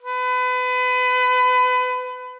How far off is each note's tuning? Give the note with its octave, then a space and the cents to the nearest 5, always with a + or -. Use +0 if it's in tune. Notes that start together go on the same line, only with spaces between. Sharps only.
B4 +30